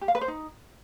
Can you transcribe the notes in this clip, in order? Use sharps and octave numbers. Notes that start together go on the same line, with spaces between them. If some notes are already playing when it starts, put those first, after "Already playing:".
G4
F5
B4
C5
D#4